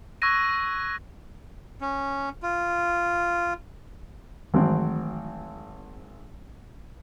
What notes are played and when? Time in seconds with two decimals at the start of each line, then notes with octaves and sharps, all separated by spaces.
0.22 C#6 E6 F#6 G#6 A#6 D#7
1.81 C#4
2.42 F4
4.54 G#1 D#3 E3 F#3 A3 C4